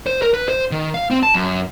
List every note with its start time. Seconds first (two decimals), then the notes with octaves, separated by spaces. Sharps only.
0.07 C5
0.22 A#4
0.34 B4
0.48 C5
0.71 D#3
0.94 F5
1.10 C4
1.23 A5
1.34 F#2